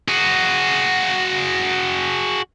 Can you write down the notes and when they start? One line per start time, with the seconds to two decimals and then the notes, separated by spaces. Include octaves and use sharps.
0.08 F#4 G#4